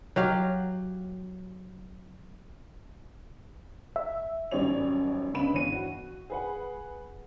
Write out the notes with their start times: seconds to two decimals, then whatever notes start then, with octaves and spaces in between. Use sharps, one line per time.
0.16 F#3 G4 F5
3.96 E5
4.51 G#1 F#2 G3 C#5 D5 F7
5.34 C#2 C#3 B3 D4 B5 E7
5.53 G1 E3 C#5 D#7
5.72 F#4
6.30 G#4 B4 F#5